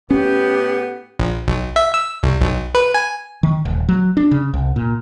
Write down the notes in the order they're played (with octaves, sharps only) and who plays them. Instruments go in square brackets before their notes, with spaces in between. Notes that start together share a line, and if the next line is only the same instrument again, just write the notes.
[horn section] A2 B3 [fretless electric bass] C#4 [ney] G4
[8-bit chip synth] A#1
B1
E5
E6
C2
B1
B4
G#5
[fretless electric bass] D#3
D#1
F#3
D4
C#3
C2
A#2